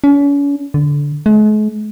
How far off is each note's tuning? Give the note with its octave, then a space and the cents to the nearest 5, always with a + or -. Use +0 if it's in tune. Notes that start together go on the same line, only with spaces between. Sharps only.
C#4 +40
D3 -15
G#3 +45